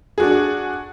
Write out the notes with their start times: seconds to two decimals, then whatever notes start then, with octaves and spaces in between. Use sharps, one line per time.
0.18 D4 F#4 G#4